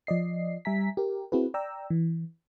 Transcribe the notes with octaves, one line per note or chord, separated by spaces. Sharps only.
F3 D5 D#5 C7
G3 E5 G#5 A#5 B6
G4 A#4
C4 E4 F#4 G#4 B4
D5 G5 A#5 E6
E3